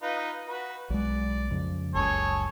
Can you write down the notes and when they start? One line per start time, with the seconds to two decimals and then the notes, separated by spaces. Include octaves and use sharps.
0.03 D#4 F4 B4
0.47 F#4 B4
0.90 B1 G#3 D5
1.51 F2 C#3
1.95 F#1 C#2 G#4 A4 C#5